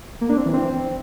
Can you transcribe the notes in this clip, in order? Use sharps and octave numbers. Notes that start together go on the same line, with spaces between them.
A#3
D4
C4
E3
C4